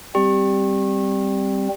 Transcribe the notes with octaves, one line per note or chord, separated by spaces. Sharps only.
G3 C4 G4